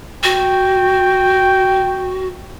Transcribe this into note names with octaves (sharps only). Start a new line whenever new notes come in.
F#4 G5